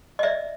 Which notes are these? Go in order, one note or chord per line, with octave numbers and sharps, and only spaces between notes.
D#5
D5 E5